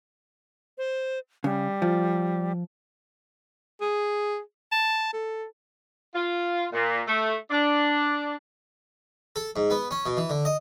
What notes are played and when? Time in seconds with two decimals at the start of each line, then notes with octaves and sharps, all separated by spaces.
0.78 C5
1.44 C#3 G3
1.82 F3
3.81 G#4
4.72 A5
5.13 A4
6.14 F4
6.72 A#2
7.07 A3
7.51 D4
9.36 A4
9.56 G#2
9.70 B3
9.91 C#4
10.06 B2
10.17 E3
10.30 D3
10.45 D#5